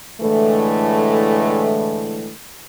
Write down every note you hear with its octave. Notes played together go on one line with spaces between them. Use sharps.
A2 D3 E3 G#3 A3